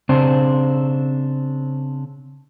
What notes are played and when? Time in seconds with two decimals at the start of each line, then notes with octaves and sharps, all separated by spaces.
0.09 C#3 C4 D4 C5